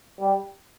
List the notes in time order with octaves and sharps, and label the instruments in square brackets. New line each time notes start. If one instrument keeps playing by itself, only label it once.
[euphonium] G3